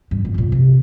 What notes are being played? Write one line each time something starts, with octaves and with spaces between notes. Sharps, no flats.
G2
G#2
C3
A#2
C3